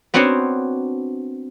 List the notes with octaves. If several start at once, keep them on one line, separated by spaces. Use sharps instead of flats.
B3 C4 D4 F#4 C5 C#5